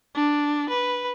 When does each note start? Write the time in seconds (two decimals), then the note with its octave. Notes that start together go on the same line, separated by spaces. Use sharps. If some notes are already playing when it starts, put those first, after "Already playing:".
0.15 D4
0.70 B4